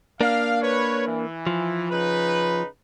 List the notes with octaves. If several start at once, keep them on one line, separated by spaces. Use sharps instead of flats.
A#3 D4 F5
B4 C#5
E3
F3
C#3 D#4 B4